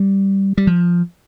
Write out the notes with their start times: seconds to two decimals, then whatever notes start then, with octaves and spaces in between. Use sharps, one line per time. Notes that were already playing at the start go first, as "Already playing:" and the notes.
Already playing: G3
0.58 G3
0.67 F3